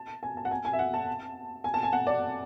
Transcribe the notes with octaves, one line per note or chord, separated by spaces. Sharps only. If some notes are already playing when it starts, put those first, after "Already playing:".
Already playing: A5
G#5
A5
F#5
G#5
G#5
E5
F#5
A5
G#5
A5
G#5
F#5
D5